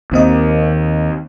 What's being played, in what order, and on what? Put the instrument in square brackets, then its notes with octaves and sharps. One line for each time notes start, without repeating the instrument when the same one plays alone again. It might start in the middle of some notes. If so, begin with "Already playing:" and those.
[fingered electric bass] D#2 [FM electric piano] D#3 C4 D#5